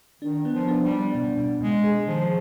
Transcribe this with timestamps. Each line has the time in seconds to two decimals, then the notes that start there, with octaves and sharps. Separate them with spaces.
0.22 D#3 D4
0.45 B3
0.53 F3
0.68 D4
0.83 G3
0.91 D4
1.15 B2
1.37 B2
1.60 B2 G#3
1.84 G#4
2.07 D#3 F3